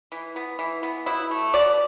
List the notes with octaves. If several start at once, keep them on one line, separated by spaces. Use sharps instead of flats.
E3
B3
E3
B3
B2 E4
A3
B2 D5